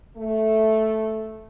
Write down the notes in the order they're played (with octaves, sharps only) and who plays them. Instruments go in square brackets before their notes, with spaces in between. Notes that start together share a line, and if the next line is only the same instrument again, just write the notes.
[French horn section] A3